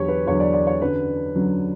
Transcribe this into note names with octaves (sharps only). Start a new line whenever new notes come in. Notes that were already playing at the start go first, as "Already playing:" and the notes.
Already playing: E2 D3 F#3 G4 C#5
B4
E2 D3 F#3 C#5
D5
D5
C#5
F#2 D3 F#3 B4
F#2 D3 F#3